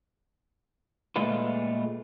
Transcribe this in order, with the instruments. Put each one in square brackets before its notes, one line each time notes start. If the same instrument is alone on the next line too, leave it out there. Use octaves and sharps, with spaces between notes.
[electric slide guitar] A#2 G#3 A3 F4 B4